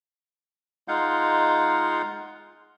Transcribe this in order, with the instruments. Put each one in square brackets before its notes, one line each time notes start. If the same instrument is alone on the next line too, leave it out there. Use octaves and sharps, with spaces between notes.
[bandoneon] G#3 D#4 F4 F5 F#5 G6